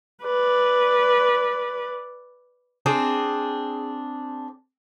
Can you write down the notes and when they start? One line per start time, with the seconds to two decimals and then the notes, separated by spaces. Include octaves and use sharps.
0.24 B4 D5
2.86 C4 D4 G#4